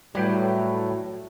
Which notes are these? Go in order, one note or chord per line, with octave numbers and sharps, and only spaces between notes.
A2 F#3 G3 B4 G5